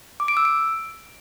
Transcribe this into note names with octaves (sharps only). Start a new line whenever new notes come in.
D6
D7
E6
D7